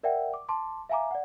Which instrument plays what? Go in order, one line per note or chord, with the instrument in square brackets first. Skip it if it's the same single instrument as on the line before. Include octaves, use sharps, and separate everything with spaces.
[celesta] A#4 D5 E5 F#5 G5
D6
A5 C6 D6
E5 F5 G#5 A#5 D6
D5 F#5